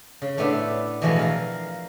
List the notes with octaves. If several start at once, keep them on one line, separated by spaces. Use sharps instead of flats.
C#3
A2 A3 B3 D4 E5 C6
B2 E3 F3 G#3 A3 B3
A#4 F5